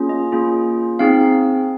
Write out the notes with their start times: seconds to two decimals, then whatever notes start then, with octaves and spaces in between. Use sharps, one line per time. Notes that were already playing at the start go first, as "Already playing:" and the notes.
Already playing: A#3 C#4 F4 G#4
0.09 D#5
0.32 A#3 C#4 F4 G#4
0.99 C4 D#4 G#4 F5